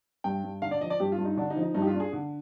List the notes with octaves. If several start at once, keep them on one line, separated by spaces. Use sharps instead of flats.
G2 G5
G2
D3 F5
D5
F3 D#5
D5
G2 G4
F4
G2
D#4
D3 D4
D#4
F3
D#4
G2 D#4
G4
F4
D4
G#4
D3